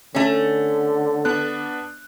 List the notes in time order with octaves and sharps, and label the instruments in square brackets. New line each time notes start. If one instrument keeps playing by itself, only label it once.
[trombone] D3 [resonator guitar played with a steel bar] A3 C#4
[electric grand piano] B3 D4 F#6